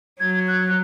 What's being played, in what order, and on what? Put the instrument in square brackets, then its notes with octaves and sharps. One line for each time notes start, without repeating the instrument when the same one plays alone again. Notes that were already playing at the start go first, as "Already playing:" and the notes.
[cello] F#3 [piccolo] G#6
[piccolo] F#6